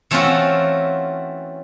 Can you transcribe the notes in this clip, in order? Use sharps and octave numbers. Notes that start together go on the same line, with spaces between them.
E3 A3 C4 C#4 F4 F#4